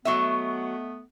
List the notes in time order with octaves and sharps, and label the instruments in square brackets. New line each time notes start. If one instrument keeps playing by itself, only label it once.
[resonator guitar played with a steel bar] F#3 E5 [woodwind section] A3 B3 [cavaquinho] D#5 C#6